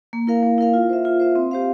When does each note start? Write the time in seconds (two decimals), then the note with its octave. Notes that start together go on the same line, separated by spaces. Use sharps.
0.13 A#3
0.27 E4 A#4 F5
0.43 A#3
0.58 E4 A#4 F5
0.74 F4
0.89 C5 E5
1.05 F4
1.20 C5 E5
1.36 C4
1.51 G4 C5 F5